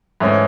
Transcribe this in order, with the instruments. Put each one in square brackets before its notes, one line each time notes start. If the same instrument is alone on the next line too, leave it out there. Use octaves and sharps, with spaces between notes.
[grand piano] G#2 E3 A3 C#4